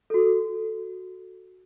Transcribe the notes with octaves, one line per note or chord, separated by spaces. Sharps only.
F#4 A4